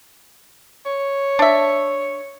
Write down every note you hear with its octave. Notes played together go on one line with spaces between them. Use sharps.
C#5
D4 E5